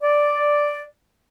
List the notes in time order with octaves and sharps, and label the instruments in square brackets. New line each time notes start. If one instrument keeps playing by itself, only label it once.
[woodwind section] D5